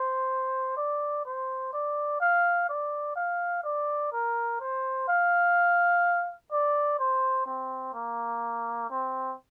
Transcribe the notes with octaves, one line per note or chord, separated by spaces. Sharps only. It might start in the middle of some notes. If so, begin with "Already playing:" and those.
Already playing: C5
D5
C5
D5
F5
D5
F5
D5
A#4
C5
F5
D5
C5
C4
A#3
C4